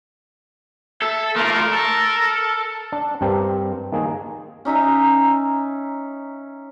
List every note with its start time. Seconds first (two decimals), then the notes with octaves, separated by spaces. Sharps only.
1.02 A4 E5
1.36 A3 F4 A#4
1.73 A4
2.92 D4
3.21 G2 G3 C4 G4 A#4
3.92 D#3 A#3 G#4
4.65 C#4 D#4 E5 A#5